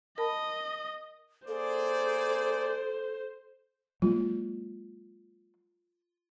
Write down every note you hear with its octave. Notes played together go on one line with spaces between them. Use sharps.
A#4 D#5 A5 B5
A#3 G#4 A4 C5 D5
F#3 G#3 A#3 F4